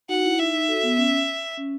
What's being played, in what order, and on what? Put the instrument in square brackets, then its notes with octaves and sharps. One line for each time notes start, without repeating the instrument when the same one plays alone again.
[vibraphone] D#4 F#4 [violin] F#5
[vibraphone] E4
[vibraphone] D#4 [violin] E5
[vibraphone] D#4
F#4 A4
B3
C#4
C#4